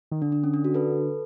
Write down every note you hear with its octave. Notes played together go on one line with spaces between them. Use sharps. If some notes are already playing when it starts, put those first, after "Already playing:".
D#3
D3 D4
D4
C#4
D4
F#4
A4 B4